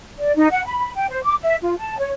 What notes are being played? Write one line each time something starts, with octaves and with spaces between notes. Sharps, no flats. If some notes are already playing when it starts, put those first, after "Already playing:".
D5
D#4
F#5
B5
G5
C5
D6
E5
F4
A5
C#5